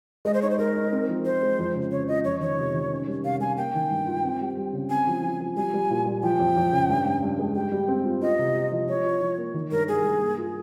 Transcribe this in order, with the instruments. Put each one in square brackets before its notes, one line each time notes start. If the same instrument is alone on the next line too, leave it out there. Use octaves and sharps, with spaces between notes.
[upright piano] G#3 [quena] D#5
[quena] C5
[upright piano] D#4 [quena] C#5
[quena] C5
[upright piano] G#3 [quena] A#4
[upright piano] D#4
C4
F3
[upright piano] F3 [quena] C5
[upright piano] G#3
F2
C#3
[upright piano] C#3 [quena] C#5
[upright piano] F3 [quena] D#5
[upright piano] F2 [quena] C#5
[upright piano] D#3 [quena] C#5
[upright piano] C3
D#3
C#4
G3
[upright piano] C3 [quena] F5
[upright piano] G3 [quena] G#5
[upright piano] A#3 [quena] G5
[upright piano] D#3
G2
F4
C4
G3
G3
C#3
[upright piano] C4 [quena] G#5
[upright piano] F3
F3
F3
[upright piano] G3 [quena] G#5
[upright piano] G3
A#2
G3
[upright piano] F3 [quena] G5
[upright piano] F2
F2
C#3
G2
G2
G2
G#3
[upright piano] G3 [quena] G5
[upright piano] G3
C4
F4
[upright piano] F4 [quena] D#5
[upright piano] C3
F4
F3
[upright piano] F3 [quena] C#5
[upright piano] F4
F3
A#3
D#3
[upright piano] G2 [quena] A#4
[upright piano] G3 [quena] G#4
[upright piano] G2
A#3
F4